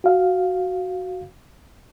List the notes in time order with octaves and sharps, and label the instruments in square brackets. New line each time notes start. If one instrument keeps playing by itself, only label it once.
[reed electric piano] F#4 F5